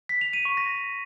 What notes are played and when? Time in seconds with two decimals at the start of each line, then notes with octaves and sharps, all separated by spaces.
0.09 B6
0.21 F7
0.33 D#7
0.45 C#6
0.57 A#6